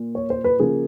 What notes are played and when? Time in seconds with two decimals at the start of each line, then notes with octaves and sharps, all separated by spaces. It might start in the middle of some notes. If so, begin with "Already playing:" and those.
Already playing: A#2
0.15 C#5
0.30 C5
0.44 B4
0.59 C#3 F3 A#3 G#4